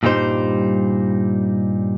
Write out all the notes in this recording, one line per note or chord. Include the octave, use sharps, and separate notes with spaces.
G2 A#2 G3 D#4 C5